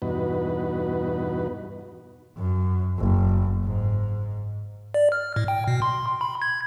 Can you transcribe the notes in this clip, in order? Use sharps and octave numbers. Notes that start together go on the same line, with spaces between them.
E2 G2 B2 D#4 F#4 B4
F#2
F#1
G#2
D5
F6
A2
G5
B2
C6
B5
G#6